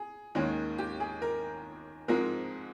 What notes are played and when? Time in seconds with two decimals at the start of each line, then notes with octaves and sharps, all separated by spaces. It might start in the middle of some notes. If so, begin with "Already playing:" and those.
Already playing: G#4
0.35 D#2 D#3 G#3 C#4
0.78 G4
1.00 G#4
1.22 A#4
2.08 G#2 F3 G#3 C4 A#4